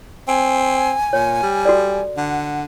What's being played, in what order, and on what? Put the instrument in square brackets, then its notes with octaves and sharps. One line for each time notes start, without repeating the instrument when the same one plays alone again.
[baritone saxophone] C4 [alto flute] G#5
[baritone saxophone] A#2 [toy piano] C#5
[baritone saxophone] G3
[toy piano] F#4 A4 D5
[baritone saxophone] D3 [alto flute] F#5